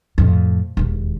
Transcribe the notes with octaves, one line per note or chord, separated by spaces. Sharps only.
F2 A2
E1 D#2